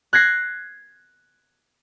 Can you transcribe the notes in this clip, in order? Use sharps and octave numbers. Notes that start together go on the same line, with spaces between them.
F#6 G#6 A#6 C7